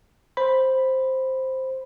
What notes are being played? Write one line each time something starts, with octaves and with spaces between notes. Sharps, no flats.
C5 B5